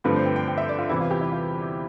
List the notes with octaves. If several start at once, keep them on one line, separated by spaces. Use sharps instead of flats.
G2 D3 F3 A3 C4 B4
C5
G5
G5
G5
E5
D5
F4
E2 C3 E3 G3 E4
F4
G4
E4
F4